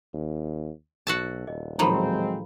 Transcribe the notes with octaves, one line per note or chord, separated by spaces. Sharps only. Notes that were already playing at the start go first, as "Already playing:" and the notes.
D#2
B1 F#4 E5 A5
D#1 D#5
A2 D#3 F3 F#3 G#3 C4 A#5 B5